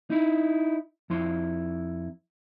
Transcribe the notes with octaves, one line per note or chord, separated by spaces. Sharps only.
D#4 E4
F2 E4 C6